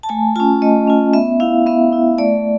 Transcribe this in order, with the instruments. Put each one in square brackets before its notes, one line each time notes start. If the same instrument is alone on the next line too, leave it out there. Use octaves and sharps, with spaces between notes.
[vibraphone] A5
A3 G#5
C#4 F4 A5
A3 D#5
C#4 F4
B3 E5
E4 F5
B3 E5
E4
A3 D5